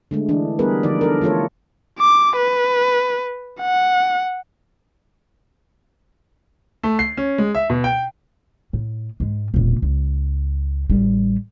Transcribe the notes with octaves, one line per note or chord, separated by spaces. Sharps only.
D3 G#3 A3
E3 D4
G3 B3 G#4 A#4 B4
D3 F3 D#4 D5
A4 A#4
E3 A3 F4 A4 C#5
D6
B4
F#5
A3
C7
C#4
G#3
E5
B2
G5
A2
G#2 G#3
E1 A#2
C#2
A1 G3